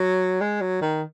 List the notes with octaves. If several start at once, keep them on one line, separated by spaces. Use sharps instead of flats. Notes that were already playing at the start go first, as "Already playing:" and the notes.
Already playing: F#3
G#3
F#3
D#3